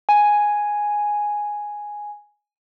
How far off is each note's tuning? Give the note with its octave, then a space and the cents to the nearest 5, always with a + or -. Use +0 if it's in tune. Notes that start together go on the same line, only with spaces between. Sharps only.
G#5 +0